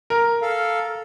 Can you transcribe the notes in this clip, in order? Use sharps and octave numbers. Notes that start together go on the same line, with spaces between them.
A#4
A4 F5